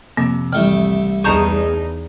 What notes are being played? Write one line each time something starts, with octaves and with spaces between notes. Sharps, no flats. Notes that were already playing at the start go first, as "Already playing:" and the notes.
F2 C3 A#3
C2 E3 A3 G5
E2 D#4 G#4 A5 A#5 C#6 G6